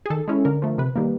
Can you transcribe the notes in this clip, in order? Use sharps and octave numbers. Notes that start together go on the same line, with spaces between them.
G#4
D#3 A4
G#3 C#4 E4
D3 A#4
F3 A3
C3 B4
D#3 G3 A#3